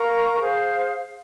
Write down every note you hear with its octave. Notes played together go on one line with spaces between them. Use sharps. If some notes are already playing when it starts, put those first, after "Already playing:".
Already playing: A#4 F5 A#5 C#6
G#4 C5 F5